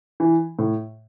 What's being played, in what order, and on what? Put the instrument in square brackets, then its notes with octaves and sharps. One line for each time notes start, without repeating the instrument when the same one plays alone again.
[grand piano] E3
A2